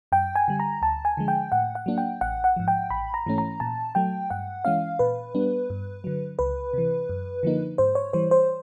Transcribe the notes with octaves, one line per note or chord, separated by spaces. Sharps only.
F#2 G5
G#5
D3 G3
A#5
D2 A5
G#5
D3 F3 G#3
G5
A2 F#5
F#5
F#3 A#3 D4
G5
A1 F#5
F#5
G#2 F3
G5
A1 B5
A#5
G#2 E3 A3 C#4
A#5
A#2 A5
F#3 A3 G5
G2 F#5
E3 G#3 C#4 F5
A#2 B4
G3 B3 D4
G2
D3 F#3
C#2 B4
C3 E3
F#2
D3 F3 A#3 D#4
G#2 C5
C#5
E3 G3 C5
C5